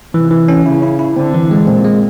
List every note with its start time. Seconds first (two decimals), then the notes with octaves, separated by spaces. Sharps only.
0.14 C3 E3
0.31 E3
0.48 C#4
0.66 C#3 E4
0.82 E4
0.99 E4
1.16 D3 C4
1.34 E3
1.51 G#3
1.67 A#2 C4
1.84 G#3